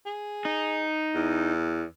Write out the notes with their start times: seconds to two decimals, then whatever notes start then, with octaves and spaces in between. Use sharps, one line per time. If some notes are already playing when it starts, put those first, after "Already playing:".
0.06 G#4
0.45 D#4
1.14 E2